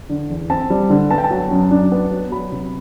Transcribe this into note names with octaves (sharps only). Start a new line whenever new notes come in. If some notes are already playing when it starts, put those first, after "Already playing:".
D3
E2
C4 A5
G3
D3
B3 A5
G5
A5
F#3
F#2
D4
B3
F#3
F#3 B5
C3